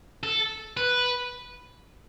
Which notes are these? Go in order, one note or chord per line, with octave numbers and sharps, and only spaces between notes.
A4
B4